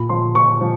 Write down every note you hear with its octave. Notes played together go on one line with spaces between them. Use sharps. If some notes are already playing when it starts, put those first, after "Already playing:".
Already playing: A#2 B5
F3 C6
A#2 C#6
F3